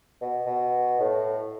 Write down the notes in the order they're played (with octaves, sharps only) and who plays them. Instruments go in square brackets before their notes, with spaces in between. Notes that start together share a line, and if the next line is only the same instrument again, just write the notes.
[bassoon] B2
B2
A2